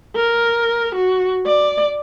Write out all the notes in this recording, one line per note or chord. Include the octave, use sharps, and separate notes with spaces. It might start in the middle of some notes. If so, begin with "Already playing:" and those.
A#4
F#4
D5